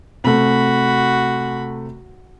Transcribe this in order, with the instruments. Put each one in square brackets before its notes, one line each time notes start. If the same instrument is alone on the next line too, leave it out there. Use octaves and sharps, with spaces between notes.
[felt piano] C3 A3 [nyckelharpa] F#4 B5